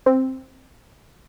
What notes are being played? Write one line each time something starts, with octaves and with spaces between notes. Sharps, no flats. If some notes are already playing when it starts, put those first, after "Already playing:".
C4